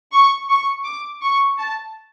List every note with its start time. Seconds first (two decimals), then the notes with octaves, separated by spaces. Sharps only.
0.12 C#6
0.49 C#6
0.85 D6
1.22 C#6
1.58 A5